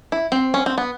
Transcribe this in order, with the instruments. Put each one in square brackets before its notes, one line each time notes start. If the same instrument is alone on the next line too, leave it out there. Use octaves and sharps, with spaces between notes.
[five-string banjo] E4
C4
C#4
C4
B3